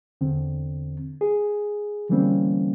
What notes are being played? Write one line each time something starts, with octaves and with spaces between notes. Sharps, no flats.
E2 D3 C4
G#4
D3 E3 G3 A#3 C4 C#4